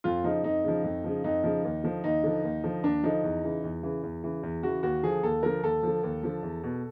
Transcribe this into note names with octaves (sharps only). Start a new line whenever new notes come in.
F2 F4
C#3 F3 D#4
F2 D#4
C#3 F3
F2
C#3 F3
F2 D#4
C#3 F3
D#2
D3 F3
D#2 D#4
D3 F3
D#2
D3 F3
D#2 D4
D3 F3 D#4
E2
C#3 E3
E2
C#3 E3
E2
C#3 E3
E2
C#3 E3 F#4
D#2 F#4
D3 F3 G#4
D#2 A4
D3 F3 A#4
D#2 A4
D3 F3
D#2
D3 F3
E2
B2